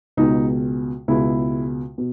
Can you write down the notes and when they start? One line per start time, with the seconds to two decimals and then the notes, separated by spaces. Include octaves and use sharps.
0.17 C#2 B2 G#3 D#4
1.08 C#2 B2 G#3 E4
1.98 B2